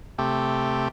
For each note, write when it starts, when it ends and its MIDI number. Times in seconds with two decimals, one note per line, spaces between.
0.18 0.88 48
0.18 0.88 57
0.18 0.88 67